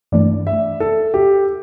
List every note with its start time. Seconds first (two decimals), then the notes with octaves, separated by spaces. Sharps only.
0.12 G2 E3 A3 D4 D5
0.47 E5
0.80 A4
1.14 G4